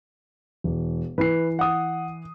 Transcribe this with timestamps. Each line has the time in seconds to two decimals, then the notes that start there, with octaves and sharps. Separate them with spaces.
0.64 E1
1.18 E3 B4 C7
1.59 F#5 D#6